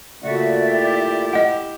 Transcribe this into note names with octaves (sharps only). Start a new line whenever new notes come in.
A#2 C#3 A3 F#4 D5 E5
E4 G4
D#5 F#5